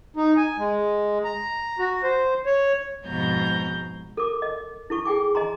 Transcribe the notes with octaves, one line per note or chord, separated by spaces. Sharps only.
D#4
G#5
G#3
A#5
F#4
C5
C#5
F2 G#2 B2 A#5 G6
A4 A#4 D6
D#5
E4 A4 C#6
G#4 G5 G#5 D6
D#5 G#5 A#5 C6